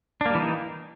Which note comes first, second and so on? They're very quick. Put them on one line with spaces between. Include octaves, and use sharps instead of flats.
D4 A#3 G3 E3 D#4